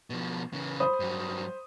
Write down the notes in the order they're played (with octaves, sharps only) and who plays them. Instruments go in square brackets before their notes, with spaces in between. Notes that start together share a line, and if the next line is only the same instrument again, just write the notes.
[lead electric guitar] B2 F3
C#3 E3
[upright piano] C5 B5 D#6
[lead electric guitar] G2 F#3